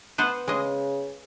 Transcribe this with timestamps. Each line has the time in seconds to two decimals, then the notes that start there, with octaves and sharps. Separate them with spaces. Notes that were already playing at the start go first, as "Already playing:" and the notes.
0.18 B3 B4 C5
0.48 C#3 G#3 D#5